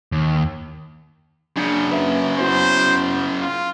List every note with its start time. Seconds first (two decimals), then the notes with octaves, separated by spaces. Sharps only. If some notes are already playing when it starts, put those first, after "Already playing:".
0.12 D#2
1.57 F#2 C#3 D4 C#7
1.91 A#3 B4 E5
2.38 B3 E4 F#4 C5
3.40 F4